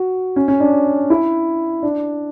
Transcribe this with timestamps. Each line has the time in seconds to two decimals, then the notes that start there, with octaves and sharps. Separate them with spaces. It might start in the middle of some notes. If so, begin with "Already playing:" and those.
Already playing: F#4
0.36 C#4
0.48 C#4
0.60 D4
1.10 E4
1.83 D4